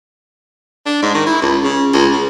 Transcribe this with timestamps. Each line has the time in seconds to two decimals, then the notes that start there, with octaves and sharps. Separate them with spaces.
0.86 D4
1.02 G#2
1.14 D#3
1.26 E4
1.42 C#2
1.64 C#3
1.94 C#2
2.13 C#3